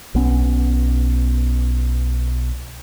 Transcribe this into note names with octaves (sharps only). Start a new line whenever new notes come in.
B1 B3 C#4